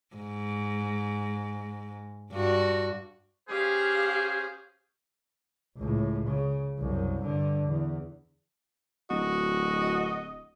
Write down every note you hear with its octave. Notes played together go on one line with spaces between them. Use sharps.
G#2
G2 F#4
C#4 G4 G#4 C5 F5
C#2 A2
C#3
C2 F#2
G2 D3
E2
D1 F#4 D#5